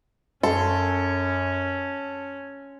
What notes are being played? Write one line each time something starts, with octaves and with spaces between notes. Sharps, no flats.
F#2 C#4 A4 C6